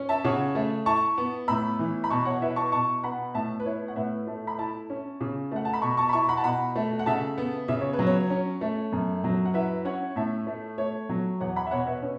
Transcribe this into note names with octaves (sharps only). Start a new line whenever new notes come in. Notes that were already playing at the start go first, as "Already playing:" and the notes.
Already playing: C#4
E5 A5
C#3 C#5 F#5
A3
E4 A5 C#6
B3
A2 B5 E6
E3
B5
B2 A5 C#6
C#5 F#5
E4 B4 E5
A5 C#6
B2 A5 C#6
B3 F#5 B5
A2 E5 A5
B4
E4 C#5
F#5
A2 B4 E5
A3
B5
E4 E5 A5
C#4
C#3
A3 F#5
A5
B5
B2 A5 C#6
A5 C#6
B5
E4 A5 C#6
F#5 B5
A5
B2 F#5 B5
A3
F#5
C#3 E5 A5
B3
C#3 E5
C#5
B4
F#3
C#5
C#4
A3
F#2
F#3
F#5
E4 B4 E5
C#4 C#5 F#5
A2 E5 A5
A3
A3 C#5
F#3
E2 C#5 F#5
F#5 B5
E5
B2 C#5 F#5
B4 E5
C#4